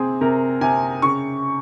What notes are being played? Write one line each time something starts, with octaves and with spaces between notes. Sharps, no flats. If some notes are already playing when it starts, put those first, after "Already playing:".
Already playing: C3 C4 G#4
C3 A#4
C3 G#5
C#3 C#6